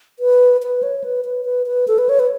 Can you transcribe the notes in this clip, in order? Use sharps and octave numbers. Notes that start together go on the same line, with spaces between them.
B4
B4
C#5
B4
B4
B4
B4
A4
B4
C#5
B4